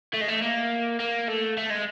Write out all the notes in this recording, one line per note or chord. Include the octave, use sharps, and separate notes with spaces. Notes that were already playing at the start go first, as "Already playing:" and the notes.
A3
G#3
A3
A#3
A#3
A3
A3
G#3